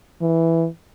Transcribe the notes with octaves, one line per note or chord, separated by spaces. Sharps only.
E3